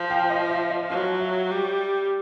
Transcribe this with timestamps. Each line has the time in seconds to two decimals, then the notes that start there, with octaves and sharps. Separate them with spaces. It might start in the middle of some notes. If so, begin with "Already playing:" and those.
Already playing: F3
0.10 F5 G5
0.30 D#5
0.50 E5
0.70 D#5 F5
0.90 F#3 D#5 F5
1.20 E5
1.50 G3